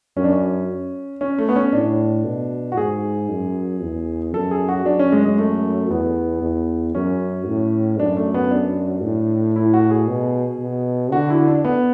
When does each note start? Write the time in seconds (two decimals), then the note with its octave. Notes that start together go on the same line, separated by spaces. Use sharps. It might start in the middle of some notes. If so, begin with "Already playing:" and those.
0.16 F#2 C#4
0.24 D4
0.32 C#4
1.21 C#4
1.38 A3
1.49 B3
1.56 C#4
1.73 A2 D4
2.25 B2
2.72 F#4
2.77 G#2 G#4
3.29 F#2
3.82 E2
4.34 F#2 A4
4.51 G#4
4.69 F#4
4.86 F#2 D4
4.99 C#4
5.12 G#3
5.25 G#3
5.38 A3
5.90 E2 B3
6.42 E2
6.95 F#2 C#4
7.47 A2
8.00 F#2 D4
8.17 A3
8.34 B3
8.51 D4
9.03 A2
9.56 E4
9.73 F#4
9.91 G#4
10.08 B2
10.60 B2
11.12 D3 F#4
11.30 E4
11.47 D4
11.65 B3